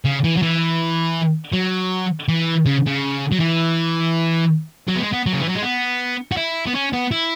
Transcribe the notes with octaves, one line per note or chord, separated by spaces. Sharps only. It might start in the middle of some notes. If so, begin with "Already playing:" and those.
C#3
E3
F#3
E3
F#3
E3
C#3
C#3
F#3
E3
F#3
B3
G#3
B3
F#3
C#3
E3
F#3
G#3
B3
F#4
E4
B3
C#4
B3
E4